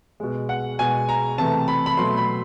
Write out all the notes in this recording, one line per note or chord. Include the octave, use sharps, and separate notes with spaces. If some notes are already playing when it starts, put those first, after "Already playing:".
B2 G#3
F#5
B2 G#3 G#5
A#5
C3 E3 A3 A5
B5
B5
B2 F#3 A3 C6
B5